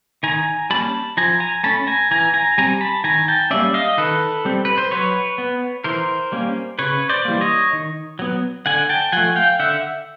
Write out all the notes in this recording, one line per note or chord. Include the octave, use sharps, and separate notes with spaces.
D#3 G#5 A#5
G3 A#3 C#4 A5 B5
F3 G#5 A#5
G#5 A#5
A3 C#4 A5 B5
G#5 A#5
E3 G#5 A#5
G#5 A#5
G3 C4 G#5 A#5
A5 B5
D#3 G#5 A#5
G5 A5
G3 A#3 C#4 D5 E5
D#5 F5
D#3 A4 B4
G3 C4
B4
C5
F#3 B4 C#5
B3
E3 A#4 C5
G3 A#3 C#4
C#3 B4 C#5
C5 D5
E3 G3 A#3
C#5 D#5
D#3
F#3 B3
D3 F#5 G#5
G5 A5
F3 A3 F#5 G#5
F5 G5
D3 E5 F#5